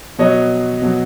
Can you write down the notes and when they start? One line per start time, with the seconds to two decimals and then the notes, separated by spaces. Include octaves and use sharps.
0.18 B2 F#3 C#5 D#5
0.82 B2 F#3